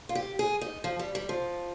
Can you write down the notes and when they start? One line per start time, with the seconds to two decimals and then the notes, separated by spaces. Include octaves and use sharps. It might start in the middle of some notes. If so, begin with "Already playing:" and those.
0.09 F4
0.15 G4
0.39 G#4
0.61 D#4
0.84 F3
0.99 G3
1.15 G3
1.29 F3